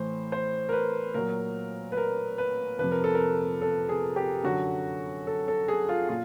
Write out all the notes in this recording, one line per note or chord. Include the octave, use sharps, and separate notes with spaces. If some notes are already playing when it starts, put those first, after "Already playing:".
Already playing: A2 E3 C5
C5
A#4
B4
A#2 F#3 A#4
B4
A#4
B4
F2 C3 F3 B4
A#4
A4
A#4
A4
G#4
G4
F#2 D3 F#3 F#4
A4
A4
G#4
F4
A#2 F4